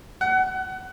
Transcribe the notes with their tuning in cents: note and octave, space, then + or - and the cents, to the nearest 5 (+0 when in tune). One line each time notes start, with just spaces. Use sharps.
F#5 +25